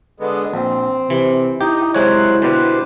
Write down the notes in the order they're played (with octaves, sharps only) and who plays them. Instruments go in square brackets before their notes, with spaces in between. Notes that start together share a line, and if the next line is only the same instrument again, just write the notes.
[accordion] D3 G#3 B3
[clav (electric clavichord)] A#1 [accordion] C4
[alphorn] C3 [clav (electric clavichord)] E3
[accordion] D#4 [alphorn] E4 [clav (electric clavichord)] G4
[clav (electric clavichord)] C3 G#3 C#5 [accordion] F#3 C5 F#6
[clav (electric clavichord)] B2 D3 [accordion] G4 B4 C5